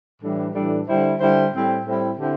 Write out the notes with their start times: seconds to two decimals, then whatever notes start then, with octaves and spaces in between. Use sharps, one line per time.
0.22 A2 E3 G3 D4 A4
0.55 A2 E3 G3 D4 A4
0.88 D3 G3 E4 C5
1.20 D3 G3 E4 C5
1.53 A2 G3 C4 E4
1.85 A2 G3 C4 E4
2.18 D3 C4 E4 G4 C5